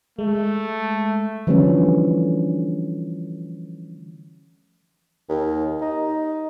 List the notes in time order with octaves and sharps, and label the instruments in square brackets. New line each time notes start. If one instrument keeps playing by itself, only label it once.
[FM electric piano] G#3 [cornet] A3
[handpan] D3 E3 F3 G3 A3 C#4
[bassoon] D#2
D#4